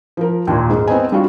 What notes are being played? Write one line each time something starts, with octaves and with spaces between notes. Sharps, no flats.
F3 A#4
D#2 A#2
G#2
B3 C4 D#5 G#5
G3 D4 F4 F#4